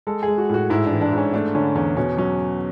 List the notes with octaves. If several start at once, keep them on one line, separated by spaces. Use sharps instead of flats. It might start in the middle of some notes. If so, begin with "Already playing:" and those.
G#3 A4
G#4
G#3
F#4
A2 F#4
G#2 E4
D4
E3
D4
G#2 C#4
A3 D4
D3 C#4
E2 C#4
B2 C#4
F#3 C#4